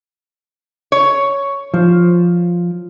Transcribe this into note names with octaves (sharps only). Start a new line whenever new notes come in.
C#5
F3